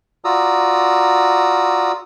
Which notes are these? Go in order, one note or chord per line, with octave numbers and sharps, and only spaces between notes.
F4 F#4 D5 A#5 D#6 E6